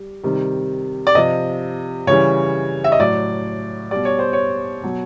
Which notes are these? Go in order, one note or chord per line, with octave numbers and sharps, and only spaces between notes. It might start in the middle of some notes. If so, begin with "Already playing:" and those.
Already playing: G3
C3 D#3 G3
D5
C3 F3 D#5
C#3 E3 G3 C#5
E5
D#5
A2 F#3 D5
B2 G3 D5
C#5
C5
C#5
B2 F#3